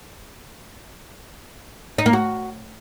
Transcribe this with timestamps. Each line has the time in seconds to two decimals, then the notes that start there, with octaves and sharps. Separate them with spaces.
1.98 D#4
2.06 A#3
2.13 F#4